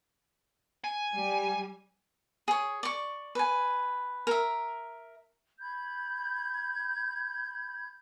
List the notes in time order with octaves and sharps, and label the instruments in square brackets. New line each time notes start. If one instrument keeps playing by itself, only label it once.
[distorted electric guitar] G#5
[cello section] G3
[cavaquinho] G#4 C#5
D5 C#6
B4 G#5
A#4 E5
[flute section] B5 G6 G#6